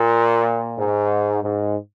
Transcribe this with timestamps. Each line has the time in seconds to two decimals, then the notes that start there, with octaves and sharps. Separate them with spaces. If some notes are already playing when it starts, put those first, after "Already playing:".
Already playing: A#2
0.78 G#2
1.42 G#2